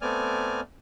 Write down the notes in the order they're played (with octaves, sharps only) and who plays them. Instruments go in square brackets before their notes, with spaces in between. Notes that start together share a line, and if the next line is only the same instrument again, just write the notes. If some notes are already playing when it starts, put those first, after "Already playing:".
[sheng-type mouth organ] A3 B3 C4 D5 G#5 F6